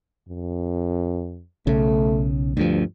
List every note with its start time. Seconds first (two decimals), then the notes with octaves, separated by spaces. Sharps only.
0.29 F2
1.67 B1 C#3 A3
2.57 D2 G2 F3